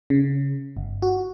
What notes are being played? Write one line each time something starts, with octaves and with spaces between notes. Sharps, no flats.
C#3
G1
F#4